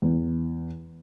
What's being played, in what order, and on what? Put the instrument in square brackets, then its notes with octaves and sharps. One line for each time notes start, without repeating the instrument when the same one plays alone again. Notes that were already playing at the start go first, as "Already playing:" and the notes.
[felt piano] E2